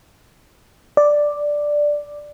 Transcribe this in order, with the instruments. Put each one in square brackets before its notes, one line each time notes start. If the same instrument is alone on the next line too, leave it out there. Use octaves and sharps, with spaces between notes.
[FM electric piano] D5